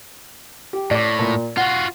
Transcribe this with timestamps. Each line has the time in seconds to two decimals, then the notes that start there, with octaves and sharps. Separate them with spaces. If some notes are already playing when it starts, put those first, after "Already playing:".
0.73 G4
0.91 A2 D5 D6
1.19 A#2
1.57 F4 F#4 F#5